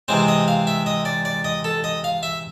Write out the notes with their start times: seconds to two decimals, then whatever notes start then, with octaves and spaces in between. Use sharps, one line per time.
0.08 C3 E3 G#3 C4 C5
0.28 D#5
0.48 F5
0.67 E5
0.86 D#5
1.05 D5
1.25 D5
1.44 D#5
1.64 A4
1.84 D#5
2.04 F5
2.23 E5